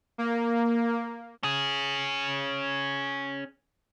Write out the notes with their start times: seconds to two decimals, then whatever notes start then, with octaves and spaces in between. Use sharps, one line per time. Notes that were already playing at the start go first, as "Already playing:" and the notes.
0.18 A#3
1.43 C#4 G#4